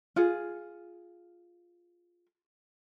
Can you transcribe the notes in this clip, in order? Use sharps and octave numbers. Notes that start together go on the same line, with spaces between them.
F4 G#4